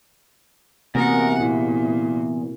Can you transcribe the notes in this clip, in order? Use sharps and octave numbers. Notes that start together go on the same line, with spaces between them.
E2 C3 A#3 F#4 A#4 F#5
A#2 E4